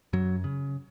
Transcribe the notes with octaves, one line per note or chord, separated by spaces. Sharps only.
F#2 F#3
C#3